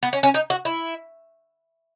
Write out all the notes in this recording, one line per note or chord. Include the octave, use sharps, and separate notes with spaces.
B3
C#4
C#4
D#4
F#4
E4